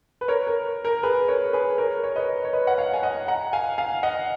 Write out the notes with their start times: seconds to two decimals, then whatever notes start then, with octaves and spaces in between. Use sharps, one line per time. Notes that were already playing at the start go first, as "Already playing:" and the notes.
0.21 B4
0.28 A#4 C#5
0.47 A#4
0.85 A#4
1.03 G#4 B4
1.28 A#4 C#5
1.53 G#4 B4
1.78 A#4 C#5
2.04 C#5
2.16 B4 D#5
2.45 C#5
2.53 B4 D#5
2.67 F#5
2.78 C#5 F5
2.93 G#5
3.03 D#5 F#5
3.28 F#5 A#5
3.53 F5 G#5
3.78 F5 G#5
4.03 D#5 F#5